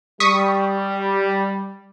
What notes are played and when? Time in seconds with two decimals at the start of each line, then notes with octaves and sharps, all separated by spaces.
0.20 G3 C#6 D#6 B6